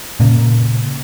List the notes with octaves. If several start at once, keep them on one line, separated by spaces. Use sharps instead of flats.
A#2 C#3 A#3